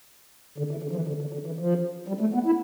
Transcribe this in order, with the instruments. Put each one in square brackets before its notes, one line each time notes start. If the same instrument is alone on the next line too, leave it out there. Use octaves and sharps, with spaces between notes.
[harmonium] D3
E3
D3
F3
E3
D3
D3
D3
E3
F3
G3
A3
B3
E4